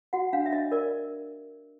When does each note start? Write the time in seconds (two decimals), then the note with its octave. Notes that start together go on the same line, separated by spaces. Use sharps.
0.13 F#4 F#5
0.33 D4 F5
0.46 E5
0.52 D4 D#5
0.72 A#4 D5